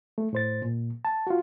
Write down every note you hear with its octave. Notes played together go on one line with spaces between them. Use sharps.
A3
A2 C5 A6
A#2
A5
F4 F#4